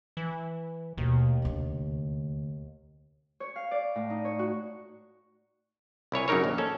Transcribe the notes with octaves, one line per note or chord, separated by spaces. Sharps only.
E3
D#2 B2 A3
D2 C3
C#5
F5
D5
A2
D#4
C#5
F#4
C2 E4 C#5 G#5
F#2 C#3 D#4 A#4 C#5
A#1 D#2
C#4 A4